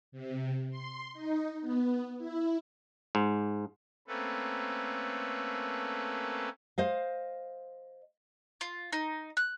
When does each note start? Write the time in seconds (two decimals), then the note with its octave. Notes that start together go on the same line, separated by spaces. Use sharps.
0.12 C3
0.70 C6
1.14 D#4
1.61 B3
2.18 E4
3.15 G#2
4.08 A3 A#3 C4 C#4 A4 B4
6.78 C5 D#5 F5
8.61 F4
8.93 D#4
9.37 F#6